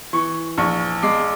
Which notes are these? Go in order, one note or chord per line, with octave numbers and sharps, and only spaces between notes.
E3 C#6
A#1 C#6
G#3 D6